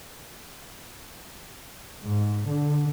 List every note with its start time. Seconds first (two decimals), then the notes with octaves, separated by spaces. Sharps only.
2.04 G#2
2.49 D3